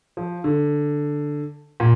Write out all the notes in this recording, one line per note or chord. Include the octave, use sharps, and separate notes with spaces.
F3
D3
A#2